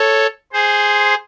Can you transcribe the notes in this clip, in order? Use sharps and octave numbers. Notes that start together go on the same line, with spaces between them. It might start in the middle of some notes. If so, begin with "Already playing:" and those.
Already playing: A4 C#5
G#4 C5